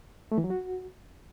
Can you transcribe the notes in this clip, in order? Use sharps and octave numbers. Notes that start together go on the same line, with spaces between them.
A3
E3
F#3
F#4